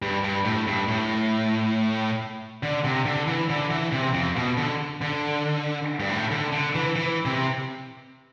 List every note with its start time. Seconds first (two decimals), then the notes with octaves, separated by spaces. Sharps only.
0.02 G2
0.24 G2
0.45 A2
0.67 G2
0.88 A2
2.63 D3
2.84 C3
3.06 D3
3.27 E3
3.50 D3
3.71 E3
3.92 C3
4.14 F2
4.36 B2
4.57 D3
5.01 D3
6.00 G2
6.09 A2
6.31 D3
6.52 D3
6.75 E3
6.96 E3
7.25 C3